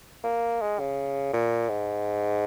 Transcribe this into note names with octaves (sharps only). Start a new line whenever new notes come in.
A#3
G#3
C#3
A#2
G#2